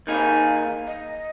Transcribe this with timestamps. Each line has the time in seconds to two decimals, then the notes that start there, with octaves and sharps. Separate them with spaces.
0.07 D#3 A#3 D#4 G#4 F5
0.87 D#5